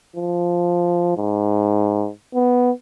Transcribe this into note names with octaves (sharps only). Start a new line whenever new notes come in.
F3
G#2
B3